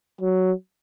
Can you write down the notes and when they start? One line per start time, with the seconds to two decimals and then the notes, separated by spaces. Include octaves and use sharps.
0.21 F#3